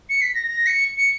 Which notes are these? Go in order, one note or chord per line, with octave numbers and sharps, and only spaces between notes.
C#7
B6
A#6
A#6
C#7
C#7